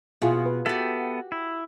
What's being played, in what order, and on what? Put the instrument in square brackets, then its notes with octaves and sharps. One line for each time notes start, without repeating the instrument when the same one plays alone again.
[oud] B2 [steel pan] E4 F4 G#4
[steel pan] B4
[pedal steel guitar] B3 A4 E5 [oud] F#4 G4
[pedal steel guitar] E4